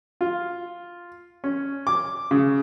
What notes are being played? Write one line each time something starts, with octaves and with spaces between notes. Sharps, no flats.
F4
C#4
D6
C#3